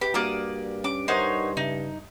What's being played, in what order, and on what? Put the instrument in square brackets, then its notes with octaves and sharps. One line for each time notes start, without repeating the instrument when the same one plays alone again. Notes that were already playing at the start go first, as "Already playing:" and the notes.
[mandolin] G4 [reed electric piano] B4
[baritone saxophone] G2 [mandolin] A#3 D5 D#6 [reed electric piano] F#4
[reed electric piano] C#4 [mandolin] D6
[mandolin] D#4 C5 C#5 [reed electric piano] A#4 F#5 D#6
[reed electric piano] C#3 [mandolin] D#4